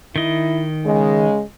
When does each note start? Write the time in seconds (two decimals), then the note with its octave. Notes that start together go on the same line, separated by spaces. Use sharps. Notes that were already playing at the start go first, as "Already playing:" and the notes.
0.16 D#3 E4 D#5
0.86 C#3 G#3